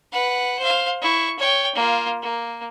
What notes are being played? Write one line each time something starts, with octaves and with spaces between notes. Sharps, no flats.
B4 F#5
C5 F5
E4 C#6
C#5 G5
A#3 F4
A#3